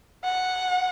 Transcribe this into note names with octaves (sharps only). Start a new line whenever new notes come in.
F#5